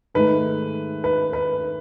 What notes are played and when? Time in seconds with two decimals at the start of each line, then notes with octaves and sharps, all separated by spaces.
0.15 G#2 D#3 A3 B4
1.04 B4
1.33 B4